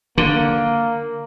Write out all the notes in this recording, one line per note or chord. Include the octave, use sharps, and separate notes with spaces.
D3 A#3